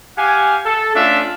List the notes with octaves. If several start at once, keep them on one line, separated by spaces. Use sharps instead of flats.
G4 F5 F#5 G#5
A4
A3 C#4 D4 F4 E5